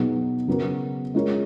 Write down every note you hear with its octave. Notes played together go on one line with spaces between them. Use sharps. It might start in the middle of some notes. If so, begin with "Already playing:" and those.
Already playing: B2 F#3 B3 D#4 G#4
C#3 F#3 B3 F#4 A#4
G#3 C#4 F4 A#4 C#5